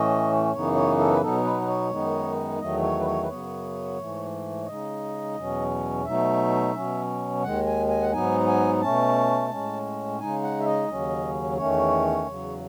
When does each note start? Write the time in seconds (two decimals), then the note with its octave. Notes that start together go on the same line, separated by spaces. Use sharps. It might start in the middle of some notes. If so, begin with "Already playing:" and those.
Already playing: A2 E3 A3 C#4 D#5
0.52 F#2 C#3 E3 B3 D#4 C#5
0.75 C#5
0.98 A4
1.11 B4
1.21 B2 F#3 B3 D#4 A4
1.44 B4
1.62 B4
1.67 C#5
1.90 F#2 D#3 G#3 B3 D#4
2.60 E2 D#3 F#3 A3 D#5
2.83 C#5
3.00 B4
3.06 C#5
3.23 B4
3.29 F#2 C#3 F#3 B3 C#5
3.98 G#2 E3 A3
4.62 C#5
4.67 C#3 G#3 D#4 D#5
5.36 E2 B2 F#3 C#4
6.05 B2 F#3 A3 D#4 E5
6.74 B2 F#3 C#4
7.43 D#2 D#3 G#3 F#5
7.66 G#5
7.89 G#5
8.02 F#5
8.12 G#2 F#3 B3 D#4 G#5
8.47 G#5
8.81 B2 A3 C#4 A5
9.50 A2 G#3 C#4
10.19 C#3 G#3 D#4 G#5
10.43 F#5
10.60 E5
10.65 D#5
10.88 D#2 C#3 F#3 C#4
11.57 E2 D#3 A3 C#4 C#5
12.27 E2 C#3 F#3